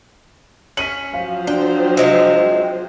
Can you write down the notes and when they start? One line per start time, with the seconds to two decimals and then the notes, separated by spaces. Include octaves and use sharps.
0.77 C#4 B6 D#7 F#7
1.14 F3 F#3 C5 F5
1.47 D4 G5
1.97 C3 G#3 C4